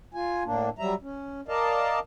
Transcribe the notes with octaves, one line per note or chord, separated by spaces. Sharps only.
F4 G#5
A2 A#3 D4
F#3 G3 E5 A#5
C#4
A#4 D5 D#5 F5 A5